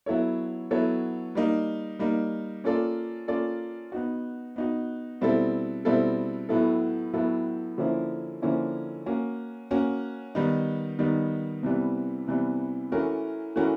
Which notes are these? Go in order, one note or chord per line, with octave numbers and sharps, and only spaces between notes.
F#3 B3 E4 A4 C#5
F#3 B3 E4 A4 C#5
G3 A#3 D#4
G3 A#3 D#4
A#3 C#4 F4 A4 D5
A#3 C#4 F4 A4 D5
B3 D#4 F#4
B3 D#4 F#4
B2 G3 C4 E4 A4
B2 G3 C4 E4 A4
A2 F#3 B3 E4 A4
A2 F#3 B3 E4 A4
D3 F3 A#3 C#4 E4
D3 F3 A#3 C#4 E4
A#3 C#4 F#4
A#3 C#4 F#4
D#3 G3 B3 D#4
D#3 G3 B3 D#4
C3 E3 G3 B3
C3 E3 G3 B3
E3 A3 C#4 F#4 A#4
E3 A3 C#4 F#4 A#4